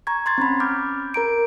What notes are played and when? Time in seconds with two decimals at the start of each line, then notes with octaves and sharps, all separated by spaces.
0.07 A#5 C#6 G#6
0.26 C6 G#6 A6
0.38 C4 C#4 B5
0.60 D6 F6 G6
1.14 A#4 A#5 D7